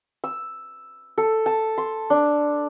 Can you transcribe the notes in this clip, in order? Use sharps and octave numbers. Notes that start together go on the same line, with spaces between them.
E6
A4
A5
C6
D4